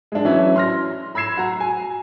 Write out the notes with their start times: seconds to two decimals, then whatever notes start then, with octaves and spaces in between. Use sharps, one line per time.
0.12 G#3 D4
0.25 E3 F#3 C#4 E4
0.56 C6 F6 A#6
1.15 B5 E6 G#6 C7 E7
1.37 F#4 A#5
1.60 G#5